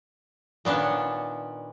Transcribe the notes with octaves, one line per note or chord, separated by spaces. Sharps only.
A#2 D#3 B3 C#4 D4